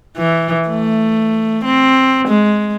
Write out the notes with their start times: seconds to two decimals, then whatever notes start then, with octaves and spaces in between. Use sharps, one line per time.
0.17 E3
0.69 A3
1.65 C4
2.28 G#3